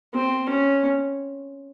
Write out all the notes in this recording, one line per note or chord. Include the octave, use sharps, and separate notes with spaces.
C4
C#4